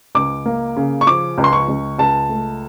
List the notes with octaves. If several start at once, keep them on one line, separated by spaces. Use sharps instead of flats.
C#2 D6
A#3
C#3
C#6
F3 D6
C#2
C6
C#6
C#2
C#2 A5
A3